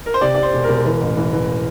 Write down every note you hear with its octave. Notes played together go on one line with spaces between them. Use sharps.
A#4
C5
C3 D5
C3 D5
C5
E1
A#4
E1
E3
A1
E3
E3